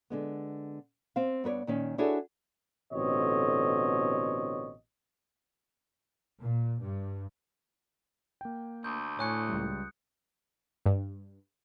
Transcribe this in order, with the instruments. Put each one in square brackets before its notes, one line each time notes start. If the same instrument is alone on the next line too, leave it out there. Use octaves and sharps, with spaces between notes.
[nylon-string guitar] D3 G#3 B3
C4 F5
G2 B3 B4 C#5 D5
A#2 D#3 C#4
D4 E4 F#4 G#4 A4 C#5
[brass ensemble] A1 B2 D3 C4 C#5 D#5
[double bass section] A#2
G2
[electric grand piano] A#3 G5
[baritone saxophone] D2 [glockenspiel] G6
[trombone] A2 [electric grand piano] C#5 G#5 C#6 [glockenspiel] D#6 F#6 C#7
[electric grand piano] C#2 G3
[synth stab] G2